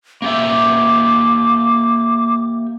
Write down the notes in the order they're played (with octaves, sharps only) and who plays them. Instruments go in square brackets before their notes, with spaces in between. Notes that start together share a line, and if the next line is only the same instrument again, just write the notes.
[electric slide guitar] A#3 G4 E5 [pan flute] D6